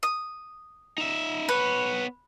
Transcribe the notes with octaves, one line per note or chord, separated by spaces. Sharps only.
D#6
D#4 E5
B3 B4 C#5